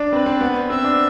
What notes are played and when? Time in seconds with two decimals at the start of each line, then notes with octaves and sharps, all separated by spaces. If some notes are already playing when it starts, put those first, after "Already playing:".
Already playing: D4
0.12 C4 B4
0.26 C4
0.41 B3
0.70 C4 E5
0.84 D4